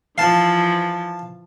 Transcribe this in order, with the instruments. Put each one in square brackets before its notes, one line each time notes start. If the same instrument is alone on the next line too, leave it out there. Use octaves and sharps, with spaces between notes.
[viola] E3 F3 [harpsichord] F5 A5